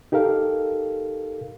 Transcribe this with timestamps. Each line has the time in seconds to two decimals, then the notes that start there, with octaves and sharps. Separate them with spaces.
0.12 D#4 G4 A4 A#4 F5